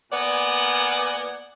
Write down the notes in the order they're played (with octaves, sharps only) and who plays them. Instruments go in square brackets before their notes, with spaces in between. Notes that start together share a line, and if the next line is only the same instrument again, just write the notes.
[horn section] A#2 B3 D5 F#5 G#5